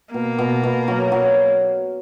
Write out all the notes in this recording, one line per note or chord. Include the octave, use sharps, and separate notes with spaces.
B2 A#3
B2
B2
F#3
F#3